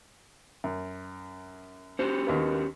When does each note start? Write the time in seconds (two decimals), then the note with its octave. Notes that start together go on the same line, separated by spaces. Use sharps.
0.64 F#2
1.99 C#4 F#4 G4 C5
2.27 D#2 A#3 B3